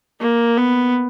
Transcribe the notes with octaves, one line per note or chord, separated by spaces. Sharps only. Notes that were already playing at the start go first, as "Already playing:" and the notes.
A#3
B3